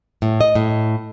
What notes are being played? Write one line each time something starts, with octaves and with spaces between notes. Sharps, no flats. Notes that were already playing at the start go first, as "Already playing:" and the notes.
A2
D#5
A2